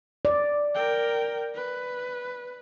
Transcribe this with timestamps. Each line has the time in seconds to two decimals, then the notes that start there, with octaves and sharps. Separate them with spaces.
0.25 D5
0.75 A#4 G5
1.55 B4